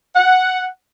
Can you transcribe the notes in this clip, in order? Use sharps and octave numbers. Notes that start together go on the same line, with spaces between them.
F#5